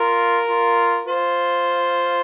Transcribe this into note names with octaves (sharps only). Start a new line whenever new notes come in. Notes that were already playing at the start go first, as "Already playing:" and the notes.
Already playing: F4 A#4
F4
F4 C5